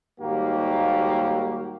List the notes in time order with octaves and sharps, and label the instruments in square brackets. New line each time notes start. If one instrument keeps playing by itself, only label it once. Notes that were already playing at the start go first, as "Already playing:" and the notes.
[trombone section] D#2 G#2 G3 A#3 F#4 G4